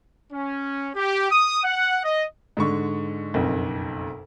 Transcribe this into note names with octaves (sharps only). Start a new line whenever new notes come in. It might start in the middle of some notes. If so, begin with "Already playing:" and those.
C#4
G4
D#6
F#5
D#5
G#2 D3 C#6
F#1 B1 F2